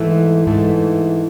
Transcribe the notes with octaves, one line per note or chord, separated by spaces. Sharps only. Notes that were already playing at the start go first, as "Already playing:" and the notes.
Already playing: G#2 E3 A3
G#2 E3 A3